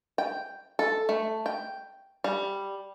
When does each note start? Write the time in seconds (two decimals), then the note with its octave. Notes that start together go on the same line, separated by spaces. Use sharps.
0.18 G5
0.79 A4
1.09 A3
1.46 G5
2.24 G3